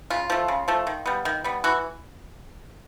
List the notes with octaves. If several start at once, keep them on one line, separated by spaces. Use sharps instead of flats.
C#3 F4
F3 A3
C#3
F3 A3
D#3
G3 B3
D#3
G3 B3
E3 F#4